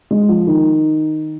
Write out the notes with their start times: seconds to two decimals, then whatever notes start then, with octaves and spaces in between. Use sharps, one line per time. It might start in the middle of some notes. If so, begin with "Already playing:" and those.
0.11 G#3
0.29 F3
0.47 D#3